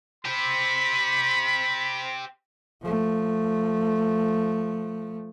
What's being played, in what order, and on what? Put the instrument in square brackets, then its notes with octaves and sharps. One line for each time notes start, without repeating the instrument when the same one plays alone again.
[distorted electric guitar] G4 C5 [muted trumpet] B5
[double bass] F3 A3